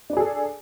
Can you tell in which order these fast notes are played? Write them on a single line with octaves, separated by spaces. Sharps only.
D4 D5 G#4 A4